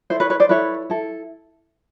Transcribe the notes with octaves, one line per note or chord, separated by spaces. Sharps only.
E4 A4 C5
B4 C#5
B4 C#5
C5 D5
E4 A4 B4 C#5
E4 A4